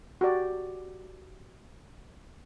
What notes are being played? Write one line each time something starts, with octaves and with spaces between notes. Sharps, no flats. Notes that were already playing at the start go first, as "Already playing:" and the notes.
F#4 G4 D5